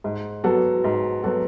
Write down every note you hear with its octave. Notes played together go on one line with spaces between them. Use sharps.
G#2
F#3 B3 F#4 A4
G#2
F#3 B3 F#4 A4